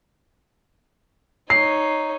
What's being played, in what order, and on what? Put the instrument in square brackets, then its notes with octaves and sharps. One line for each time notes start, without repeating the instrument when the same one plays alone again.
[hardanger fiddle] D#4 C#5 [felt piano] C7